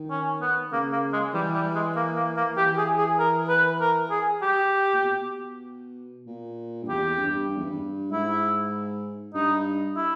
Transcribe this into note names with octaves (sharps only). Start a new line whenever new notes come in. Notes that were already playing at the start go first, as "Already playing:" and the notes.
Already playing: D#3
C#4
B3
C#3 A#3
A#3
G#3
E3 G3
G3
G#3
A#3
A#3
A#3
E3 G4
G#4
G#4
A#4
B4
A#4
G#4
G4
A#2
B2
A#2
G2
E2 G4
G2
G2
E2
G2
G#2 E4
G2 D#4
E4